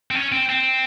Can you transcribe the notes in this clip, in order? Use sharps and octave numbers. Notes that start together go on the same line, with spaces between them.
C4
C#4
C4
C4